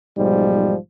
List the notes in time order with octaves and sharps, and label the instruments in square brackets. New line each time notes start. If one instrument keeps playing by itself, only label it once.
[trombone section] B1 G#2 F3 G3